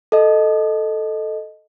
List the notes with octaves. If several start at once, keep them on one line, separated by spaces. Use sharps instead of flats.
A4 D#5